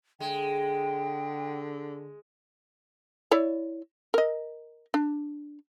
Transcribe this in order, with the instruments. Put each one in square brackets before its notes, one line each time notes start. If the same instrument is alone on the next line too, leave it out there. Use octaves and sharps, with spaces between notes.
[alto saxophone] D3 [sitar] G#3 [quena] G5
[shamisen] E4 C#5 D5
A#4 D#5
D4